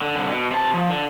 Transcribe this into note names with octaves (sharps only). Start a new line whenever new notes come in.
D3
C2 D3
B2
C3 A5
F3
D3